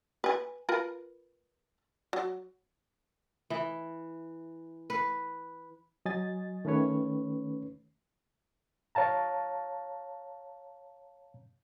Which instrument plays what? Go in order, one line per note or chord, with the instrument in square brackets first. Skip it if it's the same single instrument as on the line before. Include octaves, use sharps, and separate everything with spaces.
[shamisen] B4 G#5
F4 A#4 B4
F#3
[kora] E3
B4
[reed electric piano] F#3 D#5 G#5 A6
D#3 A3 C#4 B4 C#5
C#5 F5 A5 A#5